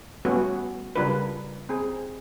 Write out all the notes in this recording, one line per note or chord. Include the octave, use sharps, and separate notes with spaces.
G3 A3 B3 C#4 F#4
C#3 G3 D4 F4 A#4 B4
C4 G#4